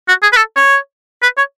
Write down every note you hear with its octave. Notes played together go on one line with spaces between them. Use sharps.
F#4
G#4
B4
A4
C#5
B4
C#5